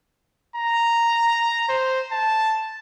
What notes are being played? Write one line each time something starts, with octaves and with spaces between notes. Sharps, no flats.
A#5
C5
A5